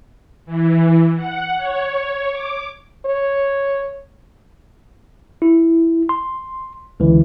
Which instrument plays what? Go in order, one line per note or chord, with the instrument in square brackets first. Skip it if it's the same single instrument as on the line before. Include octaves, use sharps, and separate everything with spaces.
[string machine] E3
F#5
C#5
D6
[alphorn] C#5
[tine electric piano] E4
C6
C#2 D3 E3